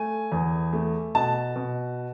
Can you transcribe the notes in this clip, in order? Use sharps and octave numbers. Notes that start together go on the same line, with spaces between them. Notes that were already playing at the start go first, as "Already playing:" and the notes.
Already playing: A3 G#5
E2
A3
B2 A5
B2